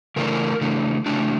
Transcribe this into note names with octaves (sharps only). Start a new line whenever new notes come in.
C#3 E3 A3 D4 A#4
C#3 E3 A3 D4
C#3 E3 A3 D4